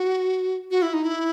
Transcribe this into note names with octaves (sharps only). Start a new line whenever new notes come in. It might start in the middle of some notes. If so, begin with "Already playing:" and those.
Already playing: F#4
F#4
E4
D#4
E4